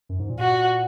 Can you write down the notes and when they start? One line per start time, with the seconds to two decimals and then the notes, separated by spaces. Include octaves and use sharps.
0.09 F#2
0.19 G#2
0.30 A#2
0.40 F#4